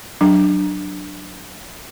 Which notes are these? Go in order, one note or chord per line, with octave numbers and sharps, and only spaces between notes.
F#3 D4